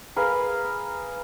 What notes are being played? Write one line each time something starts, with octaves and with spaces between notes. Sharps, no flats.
G#4 A#4 B4 F5